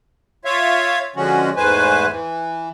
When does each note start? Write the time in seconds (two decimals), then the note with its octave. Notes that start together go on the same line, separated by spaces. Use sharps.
0.45 F4 C#5 E5 F5
1.16 D3 F3 G#3 C#4 F#4
1.56 E2 G#2 A3 B4 C5 G#5
2.09 E3